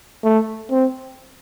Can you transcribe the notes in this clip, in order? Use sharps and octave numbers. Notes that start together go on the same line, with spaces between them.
A3
C4